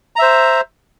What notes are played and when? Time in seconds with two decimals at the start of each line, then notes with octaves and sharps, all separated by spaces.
0.16 A#5
0.19 E5
0.22 C5